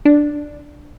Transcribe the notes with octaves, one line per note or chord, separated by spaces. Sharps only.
D4